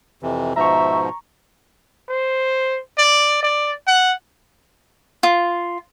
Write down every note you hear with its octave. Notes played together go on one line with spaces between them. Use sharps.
F2 C3 E3
G#2 B2 F3 E5 A#5 C#6
C5
D5
D5
F#5
F4